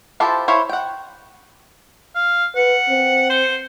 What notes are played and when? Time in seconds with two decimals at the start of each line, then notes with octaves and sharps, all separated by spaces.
0.20 E4 F4 G4 A4 C5
0.48 E4 C5 C#5 F5
0.69 F#5 G5
2.15 F5
2.56 B4 F#5
2.89 C4
3.30 C5